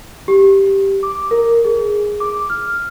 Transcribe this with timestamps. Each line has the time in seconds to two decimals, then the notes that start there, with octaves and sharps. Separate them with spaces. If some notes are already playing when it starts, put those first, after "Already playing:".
0.28 G4
1.03 D6
1.31 A#4
1.65 G#4
2.20 D6
2.50 F6